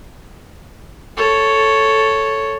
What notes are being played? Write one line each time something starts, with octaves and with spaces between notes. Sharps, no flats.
A4 C#5